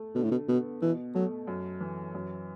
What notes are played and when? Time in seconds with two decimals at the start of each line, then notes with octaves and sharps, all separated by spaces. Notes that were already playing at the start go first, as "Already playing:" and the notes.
Already playing: A3
0.15 B2 D3
0.23 A2
0.31 B2
0.48 B2 B3
0.81 B2 E3
1.15 F#3 A3
1.47 F#2
1.81 E3
2.14 F#2